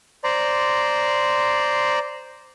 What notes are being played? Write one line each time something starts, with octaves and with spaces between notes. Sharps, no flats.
C5 D5 A#5 C6